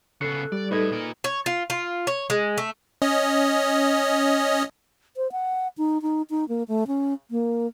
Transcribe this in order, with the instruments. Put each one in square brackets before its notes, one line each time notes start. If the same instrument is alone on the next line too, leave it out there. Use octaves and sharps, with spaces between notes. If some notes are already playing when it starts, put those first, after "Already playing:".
[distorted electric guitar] C#3 B3 [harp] A4 C#6 F#6 [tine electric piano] C7 C#7
[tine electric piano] G3 [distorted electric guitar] D5
[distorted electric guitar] A2 [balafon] D#4 G#4 A4 [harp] B4 D#5 G#6
[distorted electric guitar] A#2 A#4
[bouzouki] C#5
F4
F4
C#5
G#3
A3
[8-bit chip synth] C#4 D#5
[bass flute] C5
F#5
D#4
D#4
D#4
A#3
A3
C#4
A#3